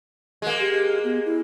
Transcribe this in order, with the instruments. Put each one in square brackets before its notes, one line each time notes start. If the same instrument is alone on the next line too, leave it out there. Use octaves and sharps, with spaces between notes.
[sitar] G#3 A#3
[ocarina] G4
B3
E4